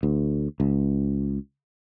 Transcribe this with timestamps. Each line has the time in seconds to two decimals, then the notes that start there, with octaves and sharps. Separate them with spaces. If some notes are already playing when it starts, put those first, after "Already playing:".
0.03 D2
0.60 C#2